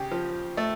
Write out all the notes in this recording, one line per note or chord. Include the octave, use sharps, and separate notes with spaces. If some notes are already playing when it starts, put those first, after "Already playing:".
Already playing: C#3 G4 G#4
F3
A3